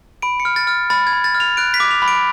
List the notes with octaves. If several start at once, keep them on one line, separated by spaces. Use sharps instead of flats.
B5 D7
C#7
F6
A6
F6
B5 A6
G#6
B5
A6
F6
F7
F#6 D7
B6
D6
F7
B5
D7